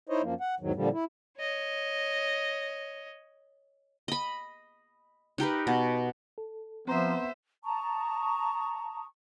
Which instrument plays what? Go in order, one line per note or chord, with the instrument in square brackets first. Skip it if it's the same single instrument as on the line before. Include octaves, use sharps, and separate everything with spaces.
[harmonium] D#4 E4 C5 C#5 D#5
F#2 F3 A#3
F#5
E2 G#2 D#3 F#3
A#2 D3 F3 G3
E4
[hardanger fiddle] C#5 D#5
[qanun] D#5 B5
D#4 G4 A#4 B4
B2
[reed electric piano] A4
[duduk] F3 [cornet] B3 [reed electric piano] C4 A#5 C6 [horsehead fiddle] C5 E5
[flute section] A5 A#5 C#6 D#6